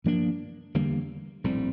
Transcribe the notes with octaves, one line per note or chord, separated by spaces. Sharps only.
G2 F3 A#3 D4
E2 D3 G3 A#3
A#1 A2 G3 C4